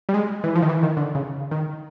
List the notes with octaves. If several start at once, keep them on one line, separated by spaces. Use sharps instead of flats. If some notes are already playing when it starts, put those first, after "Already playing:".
G3
G#3
E3
F3
D#3
E3
D#3
D3
C#3
D#3